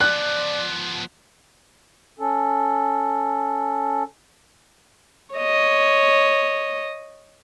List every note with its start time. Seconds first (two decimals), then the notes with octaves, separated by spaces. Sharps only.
0.01 F3 B3 D5 F#6
2.19 C#4 A4
5.35 C#5 D#5